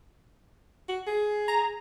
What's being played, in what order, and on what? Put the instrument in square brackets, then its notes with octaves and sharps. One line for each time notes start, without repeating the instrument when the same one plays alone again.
[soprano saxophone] F#4
G#4
[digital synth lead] A#5